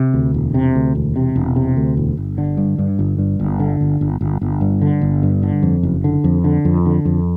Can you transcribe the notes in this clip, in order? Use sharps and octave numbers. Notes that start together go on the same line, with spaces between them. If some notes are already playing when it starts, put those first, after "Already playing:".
Already playing: C3
D2
E1
C3
D2
E1
C3
E1
C3
D2
E1
G1
D3
G2
G2
G1
G2
G1
D3
G1
G1
G1
G1
G2
D3
G1
G2
D3
F2
F#1
D3
F2
D3
F2
D3
F2